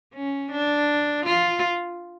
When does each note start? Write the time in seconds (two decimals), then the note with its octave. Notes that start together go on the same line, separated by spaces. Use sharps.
0.14 C#4
0.51 D4
1.25 F4